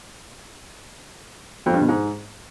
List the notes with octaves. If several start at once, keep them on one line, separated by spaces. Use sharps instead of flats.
F2
G2
B2
G#2